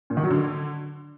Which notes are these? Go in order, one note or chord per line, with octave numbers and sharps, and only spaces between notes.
A#2
D#3
F#3
D3